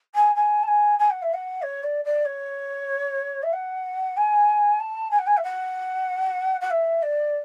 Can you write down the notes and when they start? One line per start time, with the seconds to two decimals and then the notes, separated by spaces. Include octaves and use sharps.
0.14 G#5
0.35 G#5
0.63 A5
0.67 G#5
0.99 G#5
1.10 F#5
1.22 E5
1.33 F#5
1.62 C#5
1.83 D5
2.04 D5
2.25 C#5
3.42 E5
3.52 F#5
4.16 G#5
4.80 A5
5.11 G#5
5.18 F#5
5.26 G#5
5.37 E5
5.43 F#5
6.60 F#5
6.70 E5
7.02 D5